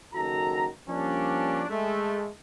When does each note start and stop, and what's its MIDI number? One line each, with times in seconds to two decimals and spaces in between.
0.14 0.66 30
0.14 0.66 51
0.14 0.66 66
0.14 0.66 69
0.14 0.66 82
0.89 1.64 53
0.89 1.64 55
0.89 1.64 58
0.89 1.64 61
0.89 1.64 62
1.70 2.28 56
1.70 2.28 57